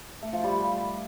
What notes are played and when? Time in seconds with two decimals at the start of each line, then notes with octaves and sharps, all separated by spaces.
0.22 A3
0.33 F3
0.44 G3